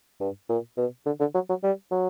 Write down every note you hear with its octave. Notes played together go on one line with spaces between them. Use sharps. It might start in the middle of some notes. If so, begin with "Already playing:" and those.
G2
A#2
B2
D3
D3
F#3
F#3
G3
F#3